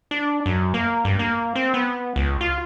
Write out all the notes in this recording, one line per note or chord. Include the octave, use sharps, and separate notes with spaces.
D4
F#2
A#3
G2
A#3
C4
B3
C#2
F4